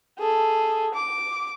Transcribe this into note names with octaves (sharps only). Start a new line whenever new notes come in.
G#4 A4
D6